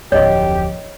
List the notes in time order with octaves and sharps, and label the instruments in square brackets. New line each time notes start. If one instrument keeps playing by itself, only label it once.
[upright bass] D1 F2 [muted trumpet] G4 [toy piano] C#5 D#5